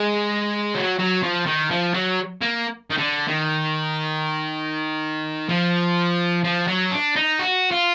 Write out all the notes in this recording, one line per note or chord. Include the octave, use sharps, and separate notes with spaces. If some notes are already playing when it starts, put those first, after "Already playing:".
Already playing: G#3
F#3
F#3
F3
D#3
F3
F#3
A#3
D#3
D3
D#3
F3
F3
F#3
D4
D#4
F#4
F4